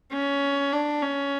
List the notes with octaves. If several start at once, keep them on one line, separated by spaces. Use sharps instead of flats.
C#4
D4
C#4